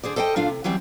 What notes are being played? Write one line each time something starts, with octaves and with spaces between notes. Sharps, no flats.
D3 G#4 C5 D5
A4 C5 D#5 F5 G5
A#2 D4 F4 F5
C3
E3 F#3 G3 C4